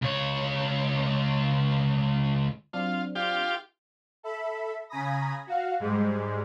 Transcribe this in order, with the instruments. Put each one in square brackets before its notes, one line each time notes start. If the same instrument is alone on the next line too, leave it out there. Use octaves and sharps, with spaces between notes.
[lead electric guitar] C#2 C#5
[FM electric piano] F#3 C4 D4 [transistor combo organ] F4
[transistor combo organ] F4 G4
[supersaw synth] A4 E5 B5
C#3 G#5 A#5 B5 D#6 A#6
F#4 F5
G#2 G3 G#3